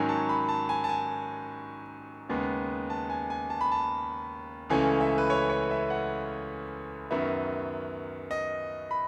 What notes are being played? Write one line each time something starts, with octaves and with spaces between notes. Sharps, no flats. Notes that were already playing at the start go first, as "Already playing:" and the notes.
Already playing: G#2 D#3 F#3 C#4 G#5
A5
B5
A5
G#5
A5
G#5
D#2 C#3 G#3 B3
A5
G#5
G#5
A5
B5
A5
C#2 C#3 E3 A3 C#4 G#5
E5
B4
C#5
C#5
E5
F#5
F#2 D#3 F#3 B3 E5
D#5
B5